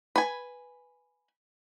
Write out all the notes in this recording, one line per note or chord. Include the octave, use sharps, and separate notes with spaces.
B4 G#5